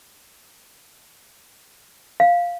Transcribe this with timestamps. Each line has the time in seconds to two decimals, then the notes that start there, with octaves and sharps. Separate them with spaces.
2.20 F5